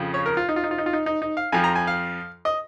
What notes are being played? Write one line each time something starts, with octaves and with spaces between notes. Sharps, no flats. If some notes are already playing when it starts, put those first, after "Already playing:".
Already playing: F2 C#3 F3
C#5
A#4
F4
D#4
F4
D#4
F4
D#4
F4
D#4
D#4
D#4
F5
F2 F3 G#5
A#5
G#5
F5
D#5